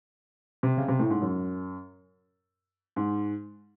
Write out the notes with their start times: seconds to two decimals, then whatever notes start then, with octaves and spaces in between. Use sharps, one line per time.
0.63 C3
0.77 C#3
0.88 C3
0.99 A2
1.10 G#2
1.22 F#2
2.96 G#2